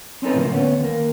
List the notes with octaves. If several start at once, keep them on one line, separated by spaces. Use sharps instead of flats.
C4 C#4 D#4 A4 B4
A2 C#3 F3 A#3
D2 B3 C#4
D#2 A#3